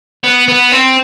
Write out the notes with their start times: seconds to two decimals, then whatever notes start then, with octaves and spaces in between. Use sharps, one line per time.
0.24 B3
0.48 B3
0.72 C4